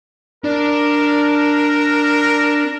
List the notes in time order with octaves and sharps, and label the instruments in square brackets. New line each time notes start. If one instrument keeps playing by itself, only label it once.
[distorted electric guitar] D4 [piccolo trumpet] A#4